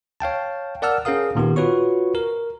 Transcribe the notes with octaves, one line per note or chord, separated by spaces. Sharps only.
C#5 F5 G5 A5
A#4 D5 F#5 A5 E6 F6
C#4 G#4 A#4 F5 D#6
A#2 D#3 B3 G4
F4 F#4 B4 C#5 C#6
A#4